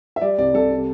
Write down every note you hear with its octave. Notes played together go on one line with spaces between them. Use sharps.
E5
G3 D5
C2 D5
C2 A4
C3